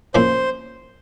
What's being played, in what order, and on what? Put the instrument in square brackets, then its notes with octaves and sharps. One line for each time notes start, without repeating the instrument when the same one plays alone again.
[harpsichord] F3 A#3 C#4 E4 [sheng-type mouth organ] C5